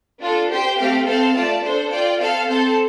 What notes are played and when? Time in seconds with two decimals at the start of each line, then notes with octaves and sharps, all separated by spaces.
0.20 D4 F4 A4
0.50 G4 C5 G5
0.78 A3 C4 G4 F5
1.06 C4 A4 C5 F5 A5
1.34 A3 F4 D5 A5
1.63 D4 A4 C5
1.91 F4 D5 G5
2.21 C4 A4 F5 A5
2.49 C4 A4 C5 A5